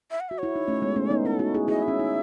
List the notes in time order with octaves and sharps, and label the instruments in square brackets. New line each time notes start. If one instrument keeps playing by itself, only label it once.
[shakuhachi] E5
F#5
[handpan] F#4 [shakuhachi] E5
[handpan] E4 [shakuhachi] C#5
[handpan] D#4
A3 C#4
G#3 B3
A3 C#4
B3 D#4
[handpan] C#4 E4 [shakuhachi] A4
[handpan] D#4 F#4
E4 G#4
[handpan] E4 G#4 [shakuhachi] D#5
[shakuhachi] E5
[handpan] C#4
D#4